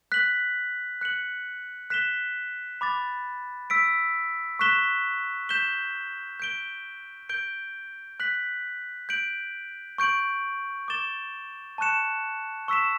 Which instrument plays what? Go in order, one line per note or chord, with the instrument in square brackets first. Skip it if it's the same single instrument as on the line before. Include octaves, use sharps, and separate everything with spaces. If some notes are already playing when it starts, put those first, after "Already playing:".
[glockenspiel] F#6 B6 F#7
F#6 C#7 F#7
F#6 B6 E7 G7
B5 D6 A6
E6 B6 D7
C#6 F#6 B6 E7 G7
G6 B6 E7 G7
G6 D7 G7
G6 D7 G7
F#6 B6 F#7
G6 D7 F#7
C#6 G6 D7 F#7
D6 A6 E7 G7
A5 C#6 F#6 C#7 E7
C#6 E6 B6 E7